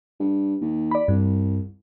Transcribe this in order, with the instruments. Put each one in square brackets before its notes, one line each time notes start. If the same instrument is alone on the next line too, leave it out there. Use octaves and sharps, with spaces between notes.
[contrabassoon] G2
D#2
[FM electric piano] D5 B5
[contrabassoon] C2 [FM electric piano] G2